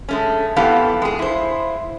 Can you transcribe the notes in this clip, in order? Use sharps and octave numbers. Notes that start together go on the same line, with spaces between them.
G#3 A3 C#4
F2 B3 E4 G4 A4 F5
G#3 G#4
E4 C5